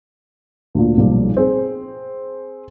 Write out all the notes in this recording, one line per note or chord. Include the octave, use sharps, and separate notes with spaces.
D2 A#2
B1 A#2 F3 G3
C4 G#4